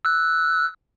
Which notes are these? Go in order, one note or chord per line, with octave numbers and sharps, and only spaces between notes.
E6 F#6